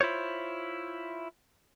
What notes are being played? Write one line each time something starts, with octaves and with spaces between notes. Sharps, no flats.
E4 F4 C5 C#5